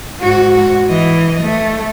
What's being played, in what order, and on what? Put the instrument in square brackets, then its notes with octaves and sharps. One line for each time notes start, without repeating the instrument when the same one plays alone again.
[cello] G#2 F#4
E3 D#5
A3